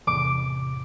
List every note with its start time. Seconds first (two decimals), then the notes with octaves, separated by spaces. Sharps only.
0.07 E2 A2 C3 D6